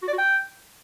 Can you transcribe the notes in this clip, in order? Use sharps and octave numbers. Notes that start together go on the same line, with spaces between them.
F#4
D5
F#4
G5